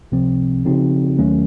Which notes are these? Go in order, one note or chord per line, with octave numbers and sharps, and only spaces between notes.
C#2 C3 F3 C4
C#3 F3 C4 D#4 F#4
D#2 D#3 F#3 A3 C#4